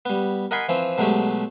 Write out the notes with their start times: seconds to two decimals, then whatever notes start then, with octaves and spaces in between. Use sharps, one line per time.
0.05 G3 B3
0.51 A#4 D#5 F#5 G#5 B5 C6
0.69 E3 F3 C4
0.98 B2 F#3 G#3 A3 G4